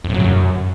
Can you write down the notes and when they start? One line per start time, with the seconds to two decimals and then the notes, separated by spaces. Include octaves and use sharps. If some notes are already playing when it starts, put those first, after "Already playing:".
0.04 F2
0.09 A2
0.14 F#3
0.19 C#3
0.24 F#2